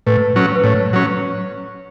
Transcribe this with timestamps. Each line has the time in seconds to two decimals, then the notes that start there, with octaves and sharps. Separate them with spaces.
0.07 A2 B4
0.36 F#3 C#4
0.56 B4
0.64 A2 C#5
0.93 F#3 C#4